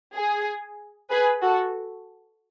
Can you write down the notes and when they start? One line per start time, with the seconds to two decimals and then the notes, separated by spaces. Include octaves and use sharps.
0.16 G#4
1.11 G#4 B4
1.43 F#4 A4